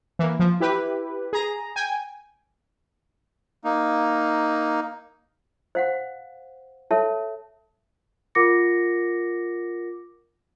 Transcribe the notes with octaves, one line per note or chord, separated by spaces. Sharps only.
E3 A#3
F3
E4 G4 B4
G#4 A#5
G5 G#5
A#3 D#4
C5 F5 F#5
A4 C#5 E5 A5
F4 A#4 F#5 D6 A#6 C#7